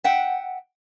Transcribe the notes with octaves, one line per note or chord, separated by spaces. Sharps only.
E5 F#5 G5